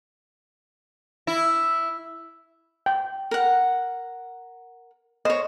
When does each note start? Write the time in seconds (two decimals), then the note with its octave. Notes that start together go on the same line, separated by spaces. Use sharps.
1.27 E4
2.86 G5
3.31 A#4 F#5
5.25 C5 C#5 D#5